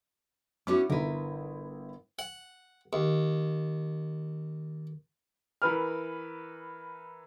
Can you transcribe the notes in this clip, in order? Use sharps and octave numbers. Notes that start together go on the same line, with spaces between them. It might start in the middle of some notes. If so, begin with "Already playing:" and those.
B3 C#4 E4 F#4 D6
G1 E4 A#4 B4
F#5
D#2
E3 A#4 B4 F6